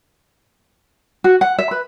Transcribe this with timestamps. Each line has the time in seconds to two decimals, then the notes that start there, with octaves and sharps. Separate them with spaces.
1.24 F#4
1.41 F#5
1.59 E5
1.71 B4